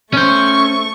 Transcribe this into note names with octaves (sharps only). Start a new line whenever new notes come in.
A3 C#4 C5 C#6